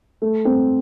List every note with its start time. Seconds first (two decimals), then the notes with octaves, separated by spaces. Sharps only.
0.22 A3
0.45 C4